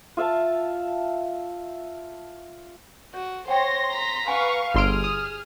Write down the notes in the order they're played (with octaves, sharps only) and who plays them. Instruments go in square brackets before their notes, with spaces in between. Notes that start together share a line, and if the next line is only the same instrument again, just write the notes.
[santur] F4 E5 F5 A5
[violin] F#4 [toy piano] C#5
[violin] C5 C#5 [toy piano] F#5 G5 C#6 [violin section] C6 A#6
[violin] A#5 B6
[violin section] B4 F5 C#6 [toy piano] F#5 G#5 C6
[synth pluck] G1 C6 D7 [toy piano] E4 G4 E6 [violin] G#4 [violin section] F6
[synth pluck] D#6